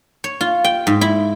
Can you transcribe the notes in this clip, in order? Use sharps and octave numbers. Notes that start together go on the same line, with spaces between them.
C#5
F4
G5
G#2
E4